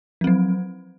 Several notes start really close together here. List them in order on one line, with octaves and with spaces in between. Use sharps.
F3 C4 F#3